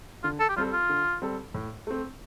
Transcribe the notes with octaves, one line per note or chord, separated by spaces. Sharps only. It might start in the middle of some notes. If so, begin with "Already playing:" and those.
D3 F4
A4
G4
G3 C4 F4 A4
F4
D3
G3 C4 A4
A2
A3 C4